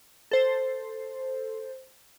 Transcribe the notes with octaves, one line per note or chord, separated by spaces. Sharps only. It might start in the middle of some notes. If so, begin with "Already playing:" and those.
A4 C5